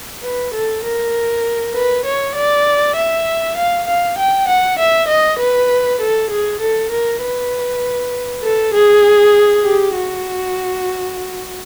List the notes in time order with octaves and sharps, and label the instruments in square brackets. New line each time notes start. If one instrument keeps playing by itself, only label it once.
[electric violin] B4
A4
A#4
B4
C#5
D5
E5
F5
F5
G5
F#5
E5
D#5
B4
A4
G#4
A4
A#4
B4
A4
G#4
G4
F#4